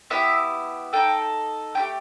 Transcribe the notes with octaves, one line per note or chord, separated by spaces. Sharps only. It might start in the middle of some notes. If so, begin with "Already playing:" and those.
B3 E4 G4 E5
D#4 A4 G5
A3 E4 G4 G5